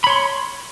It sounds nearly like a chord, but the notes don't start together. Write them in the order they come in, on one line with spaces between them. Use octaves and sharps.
B5 C#5 C6